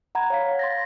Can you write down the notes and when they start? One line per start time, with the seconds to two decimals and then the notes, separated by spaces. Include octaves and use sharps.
0.15 F#5 A#5 B5 G#6
0.30 C#5 F5 B6
0.59 C6 A6 A#6